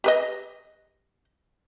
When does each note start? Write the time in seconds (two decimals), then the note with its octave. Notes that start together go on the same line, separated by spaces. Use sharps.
0.04 G4 B4 D#5